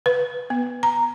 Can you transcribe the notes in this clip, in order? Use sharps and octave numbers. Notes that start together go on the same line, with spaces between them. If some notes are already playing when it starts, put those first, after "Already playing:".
B4
B3
A#5